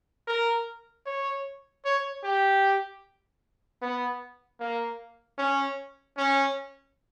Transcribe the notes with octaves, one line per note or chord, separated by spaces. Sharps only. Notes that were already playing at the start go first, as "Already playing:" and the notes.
A#4
C#5
C#5
G4
B3
A#3
C#4
C#4